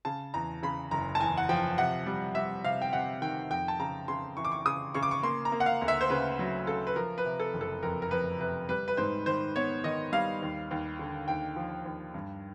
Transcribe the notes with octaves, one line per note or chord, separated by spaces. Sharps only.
C#3 A5
E2 A#5
C#3 B5
F#1 A#5
A5
E2 G#5
F#5
F3 G5
C3 F#5
G3
G3 E5
C3 F5
G5
C3 F#5
D#3 G5
F2 G5
A5
C#3 A#5
C#3 C6
E3 C#6
D6
C#6
C#3 D#6
C#3 C#6
D6
C#6
A#3 C6
A#5
A#3
F#5
F5
D2
E5
C5
C#3 B4
F#3
C#3 A4
B4
F3 A#4
B4
C3
A4
F#1
A4
F2 A#4
A#4
F2 B4
C3 B4
G3 B4
B4
G#2 C5
D#3 C5
B3 C#5
D#3 D#5
G3 F5
D#2
D#2
D3
D#2 G5
F3
D#2
G2